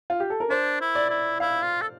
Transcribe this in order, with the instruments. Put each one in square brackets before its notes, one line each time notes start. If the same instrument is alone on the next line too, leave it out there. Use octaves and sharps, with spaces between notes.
[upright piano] F4
G4
A4
A#4
[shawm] D4 [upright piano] C5
[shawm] E4
[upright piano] D5
[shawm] E4
[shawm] E4 [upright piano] F5
[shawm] F4
A4